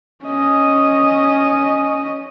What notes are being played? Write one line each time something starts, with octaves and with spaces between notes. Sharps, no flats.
C#4 D#5